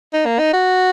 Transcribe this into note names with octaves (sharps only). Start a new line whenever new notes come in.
D#4
A#3
D#4
F#4